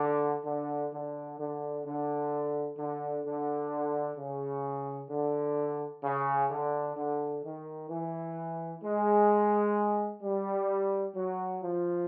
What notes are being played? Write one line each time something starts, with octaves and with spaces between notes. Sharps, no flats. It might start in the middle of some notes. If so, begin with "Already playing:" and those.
Already playing: D3
D3
D3
D3
D3
D3
D3
C#3
D3
C#3
D3
D3
D#3
E3
G#3
G3
F#3
F3